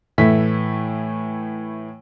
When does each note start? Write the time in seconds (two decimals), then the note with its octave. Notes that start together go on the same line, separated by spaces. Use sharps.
0.18 A2 E3 A3 B6